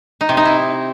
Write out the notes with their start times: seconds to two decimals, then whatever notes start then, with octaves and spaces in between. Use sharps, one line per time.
0.21 D#4
0.29 C3
0.37 D#4
0.45 E4